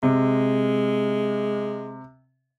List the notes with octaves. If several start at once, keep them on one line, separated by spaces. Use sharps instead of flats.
C3 G#3